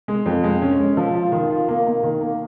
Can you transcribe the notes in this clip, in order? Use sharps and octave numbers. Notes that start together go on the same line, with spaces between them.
G#3
F2
G#3
C#4
G#3
F3
F4
D#3
F4
A#3
A#3
D#3
A#3